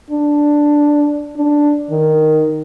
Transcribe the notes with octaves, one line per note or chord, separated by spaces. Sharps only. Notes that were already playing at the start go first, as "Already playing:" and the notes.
D4
D4
D#3